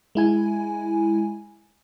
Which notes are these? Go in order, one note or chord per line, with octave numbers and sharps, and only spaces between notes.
G#3 E4 G#5